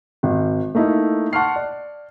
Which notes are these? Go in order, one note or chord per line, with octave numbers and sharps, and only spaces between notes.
G#1
A3 A#3 D#4 E4
F#5 A5 C6 C#6 F6 C7
D5